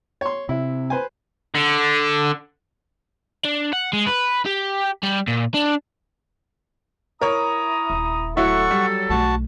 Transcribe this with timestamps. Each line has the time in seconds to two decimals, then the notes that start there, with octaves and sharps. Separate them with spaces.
0.21 C#5 C6
0.49 C3 E4
0.90 B4 C5 G#5
1.55 D3
3.45 D4
3.73 F#5
3.93 G#3
4.06 B4
4.46 G4
5.03 G3
5.27 A#2
5.54 D4
7.21 E4 A#4 C#5 A#5 D#6
7.90 D#1
8.37 F#3 A3 E4 F#4 A4 F#5 C#6
8.71 G3
9.10 B1 A3 F#4 A5